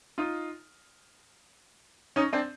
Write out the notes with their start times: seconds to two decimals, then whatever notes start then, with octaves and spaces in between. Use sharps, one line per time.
0.18 D#4 F4
2.16 C#4 D#4
2.33 C4 D4